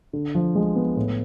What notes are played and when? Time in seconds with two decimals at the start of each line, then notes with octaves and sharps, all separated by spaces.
0.13 D3
0.35 F3
0.55 G#3
0.76 B3
0.96 A2